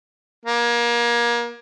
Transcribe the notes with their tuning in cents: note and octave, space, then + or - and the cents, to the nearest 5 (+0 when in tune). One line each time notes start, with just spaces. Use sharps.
A#3 +30